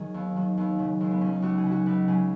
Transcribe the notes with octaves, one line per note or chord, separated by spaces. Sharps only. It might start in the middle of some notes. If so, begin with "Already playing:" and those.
Already playing: D#3 F#3 G#4
D#2 B3
D#3 F#3
D#2 B3
C#3 F#3
D#2 G#3
B3
C#3 F#3 C#4
D#4
C#2 F#4
G#4
C#3 F#3
F#4
C#2 B4
C#3 F#3 G#4